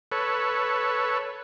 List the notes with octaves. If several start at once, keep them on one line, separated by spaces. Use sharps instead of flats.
A4 B4 C#5